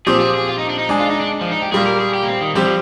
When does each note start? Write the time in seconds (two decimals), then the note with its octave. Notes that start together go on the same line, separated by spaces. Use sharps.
0.06 A#2 F3 C4 G4 G#4
0.20 G#4
0.34 G#4
0.48 F4
0.58 D#4
0.69 D4
0.78 D#4
0.89 G#3 D4 G#4
1.00 F4
1.10 D#4
1.20 D4
1.41 F3
1.51 D#4
1.62 G4
1.72 A#2 G3 A#3 G#4
1.86 A#4
2.00 G#4
2.14 G4
2.23 A#3
2.27 C4
2.41 D#3
2.55 F3 G3 C4 G4
2.65 F3